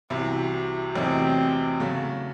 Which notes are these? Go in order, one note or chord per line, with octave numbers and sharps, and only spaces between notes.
C2 C3 E3 F#4
E2 C3 F#3 A3 C4 D#4
C#3 F#3 A3